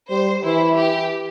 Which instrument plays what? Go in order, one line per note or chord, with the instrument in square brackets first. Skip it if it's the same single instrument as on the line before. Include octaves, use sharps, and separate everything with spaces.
[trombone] G3 [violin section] C5
[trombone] E3 [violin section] E4
[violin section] G4